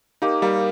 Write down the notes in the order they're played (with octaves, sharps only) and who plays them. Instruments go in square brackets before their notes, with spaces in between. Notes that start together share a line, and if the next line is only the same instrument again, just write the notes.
[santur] A#3 [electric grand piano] D#4 G4
[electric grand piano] G3 [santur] A#3